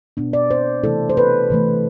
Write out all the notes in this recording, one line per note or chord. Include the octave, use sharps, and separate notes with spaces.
B2 B3 D4
D5
C5
C3 E3 A3 E4 A4
C5
B4
C3 E3 A3